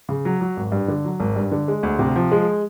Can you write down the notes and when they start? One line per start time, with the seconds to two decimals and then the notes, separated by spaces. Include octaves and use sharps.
0.09 C#3
0.25 F#3
0.41 F#3
0.57 G#1
0.72 G2
0.88 D3
1.05 F#3
1.20 G#1
1.36 G2
1.52 D3
1.68 G#3
1.83 D2
1.99 C3
2.16 F3
2.32 G#3